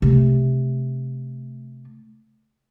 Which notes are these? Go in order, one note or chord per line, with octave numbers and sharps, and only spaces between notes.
C3 A3